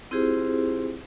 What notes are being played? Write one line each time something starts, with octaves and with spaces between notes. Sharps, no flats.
C4 E4 F4 G4 G#4 C5